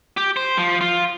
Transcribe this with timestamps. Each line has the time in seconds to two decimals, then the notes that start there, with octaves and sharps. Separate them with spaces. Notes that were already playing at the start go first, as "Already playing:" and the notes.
0.17 G4
0.36 C5
0.58 F3
0.81 F4